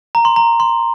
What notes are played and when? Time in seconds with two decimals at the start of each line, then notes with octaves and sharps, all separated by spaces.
0.15 A#5
0.25 C6
0.36 A#5
0.60 C6